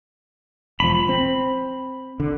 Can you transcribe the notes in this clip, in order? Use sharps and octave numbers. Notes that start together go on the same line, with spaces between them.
E1 F3 B5
C4
D3